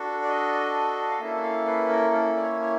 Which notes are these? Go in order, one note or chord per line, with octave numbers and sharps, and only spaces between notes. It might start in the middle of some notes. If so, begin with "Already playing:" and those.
Already playing: D4 F#4 A4
D5
D#5
F5
A#3 C#4 E4 A4 E5
E5
F5
B4
A#4
A4
D5
C#5
C#5